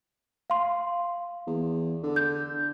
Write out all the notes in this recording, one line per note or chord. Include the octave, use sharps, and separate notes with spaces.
F5 C6
E2
D3
G6